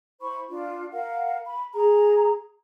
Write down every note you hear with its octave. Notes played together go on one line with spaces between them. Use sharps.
E4 C5 B5 C#6
D4 F4
A#4 F5 F#5
B5
G#4 A#5